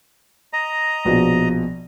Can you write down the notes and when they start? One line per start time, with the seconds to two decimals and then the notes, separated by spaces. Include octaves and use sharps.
0.53 D#5 A#5
1.05 A#1 B2 F3